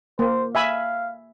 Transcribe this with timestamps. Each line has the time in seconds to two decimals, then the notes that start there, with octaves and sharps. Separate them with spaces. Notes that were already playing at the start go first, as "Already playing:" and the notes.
0.19 A#3 C5
0.55 E5 F5 G#5 B5